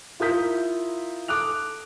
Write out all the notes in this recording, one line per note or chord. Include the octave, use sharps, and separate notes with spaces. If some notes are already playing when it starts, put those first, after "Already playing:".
E4 F4 A#4 D#6 G6 B6
A4 D6 D#6 F#6 F7